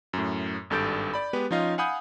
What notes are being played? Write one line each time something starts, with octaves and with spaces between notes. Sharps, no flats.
F#2 A2
G#1 G2 A4 G6 A6 D7
D5 B5
G#3 B3 G4 B4
F3 C#4 D#4 F4 D#5 F5
F5 F#5 G#5 B5 D#6 G6